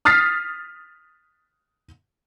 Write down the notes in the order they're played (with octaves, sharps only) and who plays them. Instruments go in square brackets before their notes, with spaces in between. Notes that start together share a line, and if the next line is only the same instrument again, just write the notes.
[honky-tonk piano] D#6 F6 A6 B6 C7